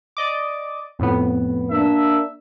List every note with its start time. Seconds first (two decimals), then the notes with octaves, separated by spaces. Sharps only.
0.17 D5 D#5 D6
0.99 F2 A2 B3
1.70 A#3 D4 E5